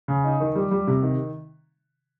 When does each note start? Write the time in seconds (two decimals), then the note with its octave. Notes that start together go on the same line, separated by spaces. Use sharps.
0.08 C#3
0.24 D#4
0.40 D#3
0.55 G3
0.71 G3
0.87 C3
1.02 D#3